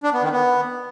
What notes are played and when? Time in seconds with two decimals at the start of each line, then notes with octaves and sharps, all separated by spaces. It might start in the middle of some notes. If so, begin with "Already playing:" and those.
0.03 D4
0.13 B3
0.23 D#3
0.32 B3